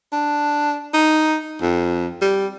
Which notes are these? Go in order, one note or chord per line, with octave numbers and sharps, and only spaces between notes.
D4
D#4
F2
G3